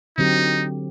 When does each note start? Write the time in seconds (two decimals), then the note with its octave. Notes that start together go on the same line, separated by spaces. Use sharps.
0.17 D3 F#3 C4 D#4 G4